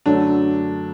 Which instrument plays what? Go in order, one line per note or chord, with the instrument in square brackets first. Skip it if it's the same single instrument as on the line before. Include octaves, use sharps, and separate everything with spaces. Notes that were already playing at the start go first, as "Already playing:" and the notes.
[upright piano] F#2 D3 F#3 A3 D4